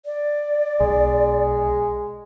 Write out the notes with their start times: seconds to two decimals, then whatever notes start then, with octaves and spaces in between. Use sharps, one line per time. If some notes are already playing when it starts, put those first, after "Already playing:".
0.06 D5
0.80 B1 G#3